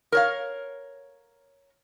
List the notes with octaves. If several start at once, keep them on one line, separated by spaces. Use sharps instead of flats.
A#4 C#5 F5